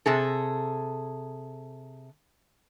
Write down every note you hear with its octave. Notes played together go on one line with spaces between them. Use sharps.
C3 G#4 A4